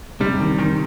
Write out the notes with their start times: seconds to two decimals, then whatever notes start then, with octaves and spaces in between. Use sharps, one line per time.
0.21 C3 G3
0.40 D#3
0.58 D#3